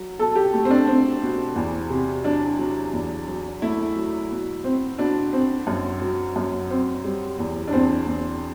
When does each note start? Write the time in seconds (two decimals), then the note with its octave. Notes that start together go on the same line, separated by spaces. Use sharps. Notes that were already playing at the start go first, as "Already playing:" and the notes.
Already playing: F#3
0.19 B2 A4
0.36 G4
0.53 A3
0.65 C4
0.70 D4
0.88 C4
1.22 B2
1.56 E2
1.90 C3
2.24 F#3 D4
2.59 F#3
2.93 E2
3.27 F#3
3.62 A3 E4
3.96 F#3
4.31 B2
4.64 C4
4.98 B2 D4
5.33 C4
5.67 F#2
6.02 F#3
6.36 F#2
6.70 C4
7.04 G3
7.39 E2
7.68 D4
7.73 E2 C4
8.07 E2